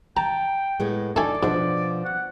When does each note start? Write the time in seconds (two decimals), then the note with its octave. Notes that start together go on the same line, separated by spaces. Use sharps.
0.17 G5 A5 A#5
0.80 A2 G#3 B3
1.16 A3 D4 D#4 A4 D5 G#5
1.43 G#2 B2 F3 D4
2.05 F#5